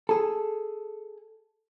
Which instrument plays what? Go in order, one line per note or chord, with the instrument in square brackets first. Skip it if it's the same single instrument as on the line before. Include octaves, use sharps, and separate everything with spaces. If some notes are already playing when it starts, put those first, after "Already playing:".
[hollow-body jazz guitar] G#4 A4